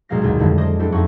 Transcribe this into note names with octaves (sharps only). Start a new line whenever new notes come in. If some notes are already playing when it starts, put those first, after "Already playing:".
B1 A#2 G#3 F5 A#6
G1 D#2
F2 D3 D#3 G3 G#3 E4
F4 C5 D#5 D6 D#6
C4 D4 E4 G4 A4
F2 A3 D#4 F#5 C#6